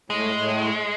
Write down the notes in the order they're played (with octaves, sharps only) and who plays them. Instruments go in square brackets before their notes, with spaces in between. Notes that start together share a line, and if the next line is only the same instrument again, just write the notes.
[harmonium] A2 [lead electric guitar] G#3
[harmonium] A2